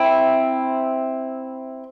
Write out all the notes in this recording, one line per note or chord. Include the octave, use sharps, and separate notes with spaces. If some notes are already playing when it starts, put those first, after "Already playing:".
Already playing: C4 E4